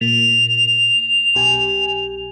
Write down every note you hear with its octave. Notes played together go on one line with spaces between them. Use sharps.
A#2 F7
B1 G4 G#5